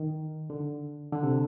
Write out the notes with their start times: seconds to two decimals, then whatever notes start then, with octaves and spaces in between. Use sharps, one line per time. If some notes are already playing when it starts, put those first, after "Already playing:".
Already playing: D#3
0.50 D3
1.12 D3
1.23 C3